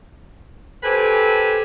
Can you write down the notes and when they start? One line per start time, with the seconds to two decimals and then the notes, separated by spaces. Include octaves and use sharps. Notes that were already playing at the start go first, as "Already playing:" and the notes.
0.83 G4 A4 B4 C5 G#5